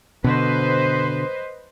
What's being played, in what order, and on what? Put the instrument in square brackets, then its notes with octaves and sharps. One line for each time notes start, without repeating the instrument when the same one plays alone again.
[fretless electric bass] B2 D3 [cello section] B4 C5 D#5